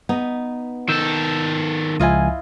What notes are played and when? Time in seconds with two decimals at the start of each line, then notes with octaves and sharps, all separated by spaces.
0.09 B3 D#4
0.89 D#3 A4 E6 G6
2.00 C#2 F3 E4 F4 D#5 G#5